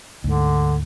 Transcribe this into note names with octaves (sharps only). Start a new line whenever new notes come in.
D2 G#2 D3